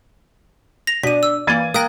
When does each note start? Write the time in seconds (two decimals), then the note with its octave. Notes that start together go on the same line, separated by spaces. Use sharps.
0.87 A#6 F7
1.03 B2 D4 D5 B6 D#7
1.23 E6
1.47 E3 A#3 G#6 A6 D#7
1.74 A#3 G5 D#6 F#6 A#6